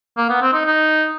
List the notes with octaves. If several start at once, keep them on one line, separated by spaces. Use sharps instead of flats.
A#3
B3
C4
D#4
D#4